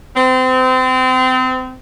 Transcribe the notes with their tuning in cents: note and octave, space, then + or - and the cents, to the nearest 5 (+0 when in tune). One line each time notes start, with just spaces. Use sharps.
C4 -30